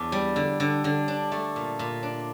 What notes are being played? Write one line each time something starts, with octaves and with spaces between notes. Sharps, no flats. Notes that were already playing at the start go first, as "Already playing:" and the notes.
Already playing: E2 D4
G3
D3
D3
D3
D4
A3
A#2
A#2
D4